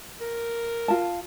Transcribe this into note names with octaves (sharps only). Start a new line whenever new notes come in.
A#4
F4 A5